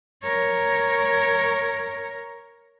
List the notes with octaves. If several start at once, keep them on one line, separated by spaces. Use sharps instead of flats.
A#4 C#5